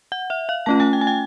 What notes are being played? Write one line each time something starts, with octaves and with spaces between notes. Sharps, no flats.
F#5
E5
F5
A3 C#4 F4 A5
G#5
G5
G#5
G5